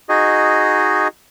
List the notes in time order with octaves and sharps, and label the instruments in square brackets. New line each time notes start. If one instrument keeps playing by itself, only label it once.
[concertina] D#4 F#4 G#4 D#5